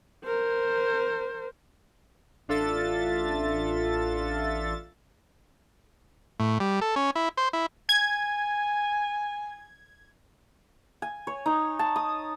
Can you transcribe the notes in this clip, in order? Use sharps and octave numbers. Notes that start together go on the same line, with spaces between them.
A#4 C5
A1 D4 F4 A4 E5 A6
A2
G3
A4
C#4
E4
C5
E4
G#5 G#6
G#5
C#5
D#4
A5
D#6